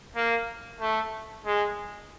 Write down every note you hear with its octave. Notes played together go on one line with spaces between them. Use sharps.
A#3
A3
G#3